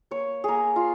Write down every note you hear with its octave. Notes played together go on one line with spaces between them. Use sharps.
A#3 C#5
A#3 G#4 A#4
F4